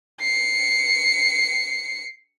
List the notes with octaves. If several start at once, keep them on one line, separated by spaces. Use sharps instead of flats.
C7 C#7